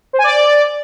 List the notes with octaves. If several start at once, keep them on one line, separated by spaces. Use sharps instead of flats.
C5
G#5
D5